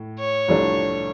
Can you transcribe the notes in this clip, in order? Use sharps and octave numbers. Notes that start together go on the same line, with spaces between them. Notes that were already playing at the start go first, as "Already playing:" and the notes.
Already playing: A2
C#5
C2 C3 F3 A3 D4